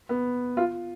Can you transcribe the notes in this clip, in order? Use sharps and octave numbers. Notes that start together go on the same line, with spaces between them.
B3
F4